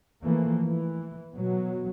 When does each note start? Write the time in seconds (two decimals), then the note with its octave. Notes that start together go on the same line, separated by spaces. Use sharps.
0.24 E3 F3 A3 A#3
0.64 E3
1.32 B2 F#3